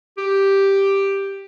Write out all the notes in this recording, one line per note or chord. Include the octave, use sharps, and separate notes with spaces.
G4